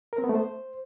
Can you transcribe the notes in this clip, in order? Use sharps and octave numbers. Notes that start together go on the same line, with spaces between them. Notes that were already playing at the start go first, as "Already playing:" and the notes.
A#4
C4
B3
A3
C5